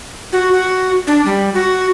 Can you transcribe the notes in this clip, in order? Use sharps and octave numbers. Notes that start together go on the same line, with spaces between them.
F#4
F#4
D4
G3
F#4